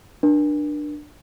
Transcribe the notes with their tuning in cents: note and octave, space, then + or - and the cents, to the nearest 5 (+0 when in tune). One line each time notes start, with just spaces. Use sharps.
D4 +15 A#4 +40